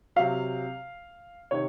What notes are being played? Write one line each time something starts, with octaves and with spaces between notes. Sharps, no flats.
C3 F#3 F5
C3 D#3 C#5